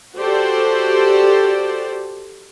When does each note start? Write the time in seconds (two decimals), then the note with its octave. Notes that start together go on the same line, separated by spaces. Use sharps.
0.14 F#4 G4 A4 C5 D5